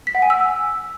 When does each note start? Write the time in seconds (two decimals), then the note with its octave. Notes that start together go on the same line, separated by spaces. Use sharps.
0.07 B6
0.15 F#5
0.22 G#5
0.30 E6